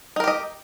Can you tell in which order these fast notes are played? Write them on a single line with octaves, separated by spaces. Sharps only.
D#4 A#4 G4 D#5